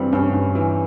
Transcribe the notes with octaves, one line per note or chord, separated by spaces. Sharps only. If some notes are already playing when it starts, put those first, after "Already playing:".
Already playing: G2 E3 G3 C4
G2 C#4
G2
E3